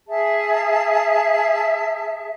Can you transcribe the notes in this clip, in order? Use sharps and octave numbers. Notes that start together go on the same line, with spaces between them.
G#4 E5 A5